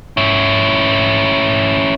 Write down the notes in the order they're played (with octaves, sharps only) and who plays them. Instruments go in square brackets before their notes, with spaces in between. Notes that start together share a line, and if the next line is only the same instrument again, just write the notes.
[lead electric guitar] C#4 E4